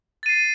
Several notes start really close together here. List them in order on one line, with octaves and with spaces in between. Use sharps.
A6 D#7 C7